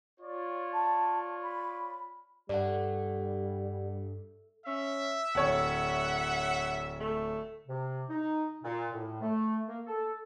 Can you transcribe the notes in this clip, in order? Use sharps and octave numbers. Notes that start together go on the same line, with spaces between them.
F4 C#5 D5
A5
B5
G2 G3 A3 D5 F#5
C#4 E5
D1 C#5 F#5
A3
C3
D#4
A#2
A2
A3
A#3
A4